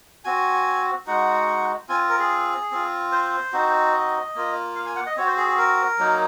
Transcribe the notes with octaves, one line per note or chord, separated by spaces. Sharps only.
C4 F#4 G#5
G#3 D#4 F#4 F#5
C4 F4 G#5
A#4
G#4
C4 F4
C5
C4 D#4 F#4
D#5
A#3 F4
F5
G#5
F#5
D#5
C4 F#4 C#5
C5
G#4
G#4
A#4
F#3 A#3 D#4